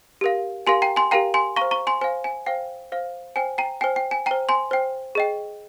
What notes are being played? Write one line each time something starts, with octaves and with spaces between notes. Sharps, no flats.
G4 A#4 F5
G4 A#4 F5 G#5 C6
G5 A#5
G#5 C6
G4 A#4 F5 G5 A#5
G#5 C6
C5 F5 A#5 C#6
A#5 C#6
G#5 C6
C5 F5 G#5
G#5
C5 F5 G5
C5 F5
C5 G5 G#5
G5 A#5
C5 G5 G#5
G5
G#5
C5 G5 A#5
G#5 C6
C5 G5
G#4 D#5 G5